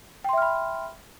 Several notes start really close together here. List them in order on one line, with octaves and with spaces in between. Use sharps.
G5 C6 E5 F6 B5